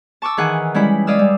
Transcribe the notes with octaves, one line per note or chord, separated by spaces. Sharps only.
A5 C#6 D6 E6
D#3 E3 G#4 F#5
G3 G#3 C#4 E4 B5
G#3 D5 F5 D#6 E6
G3